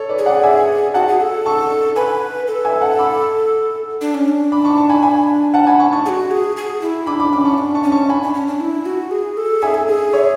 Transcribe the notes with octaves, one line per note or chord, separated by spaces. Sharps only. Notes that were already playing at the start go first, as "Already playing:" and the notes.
Already playing: A4 C#5
B4 D5
G#4
D5 F#5
E5 G#5
F#4 F#5 A5
G#4
A4
A5 C#6
B4 G#5 B5
A4
E5 G#5
F#5 A5
B5 D6
D4
C#4
D4
B5 D6
A5 C#6
A5 C#6
G#5 B5
G#5 B5
F#5 A5
G#5 B5
A5 C#6
A5 C#6
G#4
F#4
G#4
G#4
E4
D4 B5 D6
B5 D6
C#4 B5 D6
A5 C#6
D4
A5 C#6
C#4
A5 C#6
D4 G#5 B5
D4
C#4
D4
E4
F#4
G#4
A4
G#4 E5 G#5
A4
G#4
C#5 E5